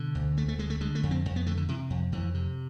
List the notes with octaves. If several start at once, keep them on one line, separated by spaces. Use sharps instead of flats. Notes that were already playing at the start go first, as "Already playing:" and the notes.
Already playing: B2 D3
D2
D2 A3
A3
D3 G#3
A3
D3 G#3
A3
F2
C4
F2
B3
D3 A3
D3
C3 E3
F2
F2 E3
C3